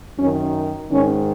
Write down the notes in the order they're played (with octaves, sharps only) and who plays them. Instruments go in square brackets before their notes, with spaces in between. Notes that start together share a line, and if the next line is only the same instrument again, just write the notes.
[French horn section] F#2 D#3 C#4
G#2 D#3 C#4